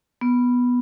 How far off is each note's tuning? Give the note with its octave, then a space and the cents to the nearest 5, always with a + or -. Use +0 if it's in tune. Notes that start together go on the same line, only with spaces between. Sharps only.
B3 -5